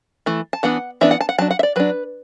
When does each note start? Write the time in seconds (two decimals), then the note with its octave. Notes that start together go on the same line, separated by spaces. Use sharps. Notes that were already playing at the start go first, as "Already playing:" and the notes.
0.26 E3 A3
0.53 A5
0.63 E3 B3 D4 F#5
1.01 E3 B3 D4 E5
1.11 F#5
1.21 A5
1.29 F#5
1.38 F#3 D4 A5
1.51 F#5
1.59 E5
1.63 D5
1.76 F#3 D4 B4